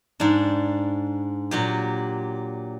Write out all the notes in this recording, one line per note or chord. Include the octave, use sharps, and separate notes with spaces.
G#2 D4
A#2 F#3 G4